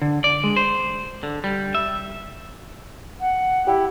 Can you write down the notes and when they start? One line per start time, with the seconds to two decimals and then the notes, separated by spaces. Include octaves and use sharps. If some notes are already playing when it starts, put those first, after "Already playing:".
0.02 D3
0.24 D5
0.44 G#3
0.56 C5
1.23 D3
1.44 G3
1.75 E5
3.20 F#5
3.67 E4 G4